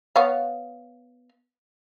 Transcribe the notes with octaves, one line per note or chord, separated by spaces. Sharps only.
B3 C#5 F5